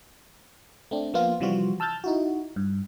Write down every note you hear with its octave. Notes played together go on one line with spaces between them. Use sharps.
A3 C4 D4
F3 A#3 B3 F4
C3 E3 F3 G3 F4 F#4
A5 E6 F6 G6 A6
D#4 E4 F#4
G2